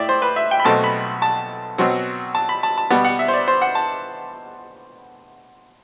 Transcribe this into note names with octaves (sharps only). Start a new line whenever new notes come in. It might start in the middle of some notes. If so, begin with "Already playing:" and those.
Already playing: A2 D5 E5 G5
C5
B4
E5
G5
B5
B1 B2 A3 C4 A5
B5
A5
B2 F#3 C4
A5
B5
A5
A5
B2 G3 B3
F#5
E5
C5
D5
C5
F#5
A5